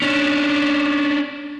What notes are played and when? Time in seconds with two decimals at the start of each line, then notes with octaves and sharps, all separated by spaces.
0.02 C#4 D4